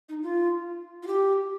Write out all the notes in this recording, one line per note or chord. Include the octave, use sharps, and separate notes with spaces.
D#4
F4
F4
G4